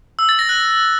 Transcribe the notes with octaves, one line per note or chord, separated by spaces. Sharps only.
E6
A6
A#6
F#6